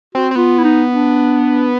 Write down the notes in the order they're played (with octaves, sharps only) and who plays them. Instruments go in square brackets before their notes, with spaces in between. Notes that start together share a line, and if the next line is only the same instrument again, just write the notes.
[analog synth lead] C4 [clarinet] F#4
[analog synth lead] C4
[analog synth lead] B3 [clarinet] F4
[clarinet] E4
D#4
D4